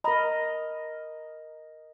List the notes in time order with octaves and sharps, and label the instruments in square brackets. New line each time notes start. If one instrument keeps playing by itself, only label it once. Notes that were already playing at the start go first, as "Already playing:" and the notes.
[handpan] A#4 D#5 [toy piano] A#5 B5